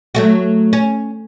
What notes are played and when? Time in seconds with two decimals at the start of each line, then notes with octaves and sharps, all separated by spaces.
0.15 F#3 A3 F#4
0.73 C#4